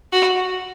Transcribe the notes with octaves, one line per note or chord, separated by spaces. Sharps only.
F#4